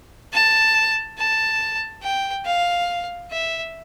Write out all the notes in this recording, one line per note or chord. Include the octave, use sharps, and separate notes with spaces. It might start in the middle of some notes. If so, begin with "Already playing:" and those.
A5
A5
G5
F5
E5